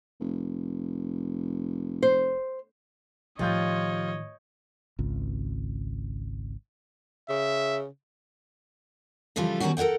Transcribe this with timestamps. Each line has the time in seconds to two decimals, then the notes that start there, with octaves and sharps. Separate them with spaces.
0.20 F1
2.03 C5
3.39 A2 D#3 F3 G3 F4 C#5 D#5 G6
4.99 G#1 C#2
7.29 C#3 E5
9.36 C#3 E3 F3 G3 F4 A4
9.60 B2 D#3 F#3 G3 C#4 F#4
9.77 A4 A#4 C#5 F#5 G5